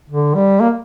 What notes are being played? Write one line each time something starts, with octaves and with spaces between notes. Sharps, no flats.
D3
G3
A#3